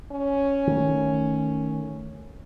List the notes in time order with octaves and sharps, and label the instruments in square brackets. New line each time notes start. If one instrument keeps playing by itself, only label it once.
[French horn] C#4
[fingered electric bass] D#3 A3